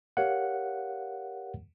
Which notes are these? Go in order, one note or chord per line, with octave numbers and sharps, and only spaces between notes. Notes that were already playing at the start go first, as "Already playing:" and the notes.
G4 A#4 C#5 F5 F#5